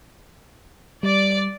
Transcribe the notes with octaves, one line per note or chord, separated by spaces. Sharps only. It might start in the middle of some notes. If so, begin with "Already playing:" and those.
G3 D5